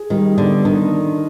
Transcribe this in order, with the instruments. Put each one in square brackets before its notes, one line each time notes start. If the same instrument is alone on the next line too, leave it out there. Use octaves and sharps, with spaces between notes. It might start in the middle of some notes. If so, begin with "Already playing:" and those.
Already playing: [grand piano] G#4
[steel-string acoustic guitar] D#3 [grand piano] G3
[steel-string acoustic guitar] D3 [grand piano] B3
[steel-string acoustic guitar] D#3 [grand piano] D4